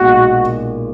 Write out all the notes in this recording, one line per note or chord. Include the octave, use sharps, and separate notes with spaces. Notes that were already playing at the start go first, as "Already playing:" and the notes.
Already playing: B1 A#2 G#3 F#4